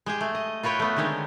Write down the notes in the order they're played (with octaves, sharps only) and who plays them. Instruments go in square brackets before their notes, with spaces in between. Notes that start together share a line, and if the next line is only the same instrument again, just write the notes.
[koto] G#3 G4 G#4
A3
D#5
F4 F#4 B4 C#5 G5
A3 B3
D3 D#3 G#3 C4 C#5